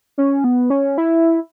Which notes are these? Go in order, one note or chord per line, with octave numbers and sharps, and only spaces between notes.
C#4
B3
C#4
E4